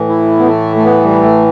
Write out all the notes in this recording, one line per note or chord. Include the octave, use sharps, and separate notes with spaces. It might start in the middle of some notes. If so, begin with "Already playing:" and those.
Already playing: A2 E3
E4
B3
A3
A3
B3
G3
A3